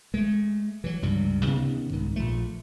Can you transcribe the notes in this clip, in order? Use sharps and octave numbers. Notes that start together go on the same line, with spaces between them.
G#3 A3
E3 F#3
C#2 G2 C3 G3
C3 D#3 B3 C#4
C2 G#2 D#3
A#1 F3 A3